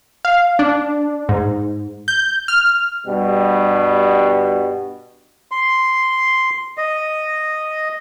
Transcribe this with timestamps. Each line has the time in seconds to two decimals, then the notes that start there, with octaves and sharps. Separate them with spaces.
0.25 F5
0.59 D4
1.29 G#2
2.08 G6
2.48 F6
3.07 G2 B2 G3
5.51 C6
6.78 D#5